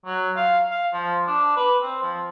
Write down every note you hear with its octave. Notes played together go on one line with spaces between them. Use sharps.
F#3
F5
F5
F3
D4
B4
C4
F3